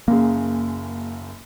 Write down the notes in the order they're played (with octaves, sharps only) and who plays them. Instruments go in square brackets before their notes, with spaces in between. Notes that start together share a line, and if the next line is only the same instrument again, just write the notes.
[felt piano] F#1 F#2 G#4 [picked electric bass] A#3